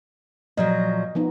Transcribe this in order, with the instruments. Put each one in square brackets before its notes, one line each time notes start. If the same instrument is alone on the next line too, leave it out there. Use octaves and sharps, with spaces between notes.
[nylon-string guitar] A#2 F3 F#3 [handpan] D#5
[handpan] F3 B3 D#4